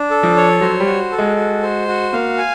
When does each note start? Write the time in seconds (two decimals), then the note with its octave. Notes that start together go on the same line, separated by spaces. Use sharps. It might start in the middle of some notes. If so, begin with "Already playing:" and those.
Already playing: D4
0.11 A4
0.23 F3
0.36 C#5
0.61 F#3 C5
0.80 G3
0.86 F#4
1.12 A4
1.18 G#3
1.37 F#4
1.63 C5
1.88 F#4
2.13 A#3 F5
2.38 G#5